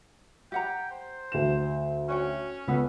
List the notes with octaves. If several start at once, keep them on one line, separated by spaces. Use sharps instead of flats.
G4 F#5 G5 A#5
C5
D2 E7
C#4 F#4 C#5 G5
C#2 B3 A4 B4